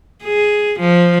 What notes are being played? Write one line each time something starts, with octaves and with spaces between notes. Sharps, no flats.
G#4
F3